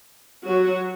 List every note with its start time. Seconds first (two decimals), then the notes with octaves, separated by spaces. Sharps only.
0.45 F#3 F#4